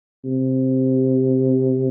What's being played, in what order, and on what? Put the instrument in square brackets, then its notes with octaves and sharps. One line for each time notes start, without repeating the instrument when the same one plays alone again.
[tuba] C3